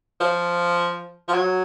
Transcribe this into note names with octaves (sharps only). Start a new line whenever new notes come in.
F3
F3
F#3